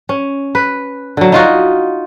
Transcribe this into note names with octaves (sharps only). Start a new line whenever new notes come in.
C#4
B4
D3 F#3
D#4 F4 F#4